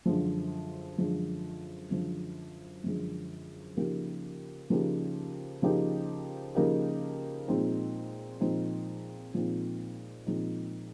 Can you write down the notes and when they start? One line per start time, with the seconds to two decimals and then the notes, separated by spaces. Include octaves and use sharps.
0.06 F#2 D3 F3 G#3
0.98 F#2 D3 F3 G#3
1.91 F#2 D3 F3 G#3
2.84 F#2 D3 F3 G#3
3.77 C#3 F3 A#3 D#4 G4
4.70 C#3 F3 A#3 D#4 G4
5.62 C#3 F3 A#3 D#4 G4
6.55 C#3 F3 A#3 D#4 G4
7.48 A#2 F3 G#3 C4 D#4
8.41 A#2 F3 G#3 C4 D#4
9.34 A#2 F3 G#3 C4 D#4
10.27 A#2 F3 G#3 C4 D#4